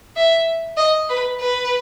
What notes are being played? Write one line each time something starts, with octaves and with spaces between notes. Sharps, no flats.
E5
D#5
B4
B4